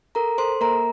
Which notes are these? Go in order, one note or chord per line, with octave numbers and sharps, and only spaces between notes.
A4 A#4 A#5
A4 C5 C6
A#3 A#4 A#5